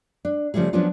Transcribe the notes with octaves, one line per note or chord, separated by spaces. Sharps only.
D4
C#3 F3 G3 A3 G#4
F3 F#3 B3 C#4 D4 F4